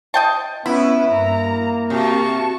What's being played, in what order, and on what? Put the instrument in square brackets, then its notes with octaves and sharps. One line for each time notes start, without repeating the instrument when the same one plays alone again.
[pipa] D#5 G5 A5
[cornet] B3 [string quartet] C#4 B4 [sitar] E4 [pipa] B5
[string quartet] G2 A#5 [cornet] A#3
[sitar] C3 [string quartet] F#4 A5 C#6